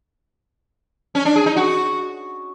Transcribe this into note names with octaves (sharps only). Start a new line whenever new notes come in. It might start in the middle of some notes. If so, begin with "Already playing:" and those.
C#4
D4
G#4
D#4
F#4